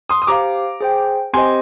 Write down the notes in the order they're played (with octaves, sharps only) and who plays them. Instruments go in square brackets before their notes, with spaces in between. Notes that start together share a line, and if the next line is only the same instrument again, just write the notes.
[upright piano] C6 D#6
D#6
[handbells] G4 C5 F5 [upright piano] A#5 D6
[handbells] G#4 C5 G5
[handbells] C4 G4 C5 D#5 [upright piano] G#5 C6